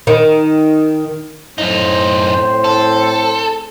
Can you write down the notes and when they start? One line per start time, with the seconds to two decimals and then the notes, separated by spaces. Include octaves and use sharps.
0.07 D#3
1.58 F#2 A2 C4 D#4 C5
2.64 A4